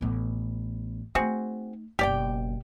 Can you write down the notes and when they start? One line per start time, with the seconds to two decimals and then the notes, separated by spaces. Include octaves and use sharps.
0.01 A1 B3
1.15 A3 C4 D#4 F#4 G#4
1.99 F#1 B2 G4 D5 G5